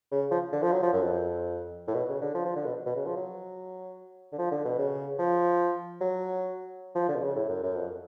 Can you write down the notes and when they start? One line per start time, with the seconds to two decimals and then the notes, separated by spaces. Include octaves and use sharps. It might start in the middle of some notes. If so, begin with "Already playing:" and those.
0.11 C#3
0.31 F3
0.52 D3
0.63 F3
0.72 F#3
0.83 F3
0.93 F#2
1.02 F2
1.87 A2
1.94 B2
2.08 C#3
2.21 D3
2.35 F3
2.45 F3
2.56 D3
2.66 B2
2.86 B2
2.96 C#3
3.06 F3
3.16 F#3
4.32 D3
4.38 F3
4.51 D3
4.65 B2
4.78 C#3
5.19 F3
6.01 F#3
6.95 F3
7.08 D3
7.16 B2
7.23 C#3
7.36 A2
7.49 F#2
7.63 F#2
7.75 F2